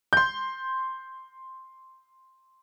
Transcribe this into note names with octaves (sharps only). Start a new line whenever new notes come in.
C6 G6